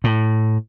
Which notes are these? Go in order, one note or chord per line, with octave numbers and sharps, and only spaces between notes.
A2